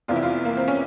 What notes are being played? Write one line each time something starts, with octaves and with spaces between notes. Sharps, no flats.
F1 E2 C3 E3 F4
E4
F4
A#3
C4
C#4